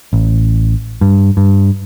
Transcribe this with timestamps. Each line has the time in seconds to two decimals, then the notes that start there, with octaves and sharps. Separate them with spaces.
0.13 A1
1.01 G2
1.37 G2